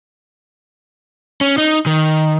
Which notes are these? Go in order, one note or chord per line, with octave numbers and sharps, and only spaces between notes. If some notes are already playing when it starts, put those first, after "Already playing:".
C#4
D#4
D#3